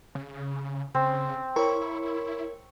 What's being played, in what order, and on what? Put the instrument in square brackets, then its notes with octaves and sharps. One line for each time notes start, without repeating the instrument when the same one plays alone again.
[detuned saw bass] C#3
[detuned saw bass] C#3 [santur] C4
[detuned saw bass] E4 [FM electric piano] A#4 C#5 [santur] C#6